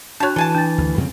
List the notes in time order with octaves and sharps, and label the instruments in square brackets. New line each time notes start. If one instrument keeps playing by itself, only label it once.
[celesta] D4 F#4 F#6 [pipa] C#5 A5
[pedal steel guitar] E3 [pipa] A4 G#5 A5
[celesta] D4 A6
[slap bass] D2
F2 C#3 C4